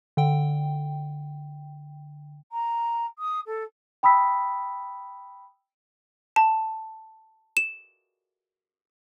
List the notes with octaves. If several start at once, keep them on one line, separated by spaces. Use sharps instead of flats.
D3 G5
A#5
D#6
A4
G5 B5 D#6 E6 B6
A5
E7